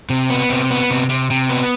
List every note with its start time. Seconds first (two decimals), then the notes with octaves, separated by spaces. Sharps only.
0.10 C3
0.30 B3
0.50 C3
0.71 B3
0.90 C3
1.09 C3
1.31 C3
1.49 B3